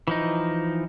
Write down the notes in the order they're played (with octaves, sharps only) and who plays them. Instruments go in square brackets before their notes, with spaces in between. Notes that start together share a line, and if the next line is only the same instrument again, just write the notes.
[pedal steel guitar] E3 F3 D#4